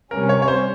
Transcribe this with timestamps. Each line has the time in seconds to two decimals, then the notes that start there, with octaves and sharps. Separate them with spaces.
0.11 C3 G3 C#4 A#4
0.29 C#5
0.42 C#5
0.48 C5